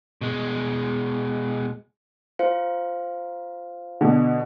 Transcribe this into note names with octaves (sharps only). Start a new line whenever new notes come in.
B2 G#3
F4 C5 F5
B2 D3